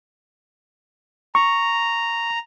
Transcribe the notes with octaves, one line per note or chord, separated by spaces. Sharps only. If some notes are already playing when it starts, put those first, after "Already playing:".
A#5 C#6